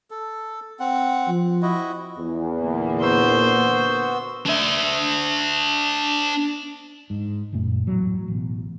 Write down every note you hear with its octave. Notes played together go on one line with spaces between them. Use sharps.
A4
C4 F#5
F3
E4 F#4 D#5
E2
A#2 D3 A#3
B3 F#4 C5 E6
D4 E5
G#2
F#1 F#2 A#2 A3
E2 A2 F#3
A1 B2